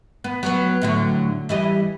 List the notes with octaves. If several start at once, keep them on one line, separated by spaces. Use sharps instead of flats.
B3
F#3 B3
A2 D3 F#3
E3 G3 D#5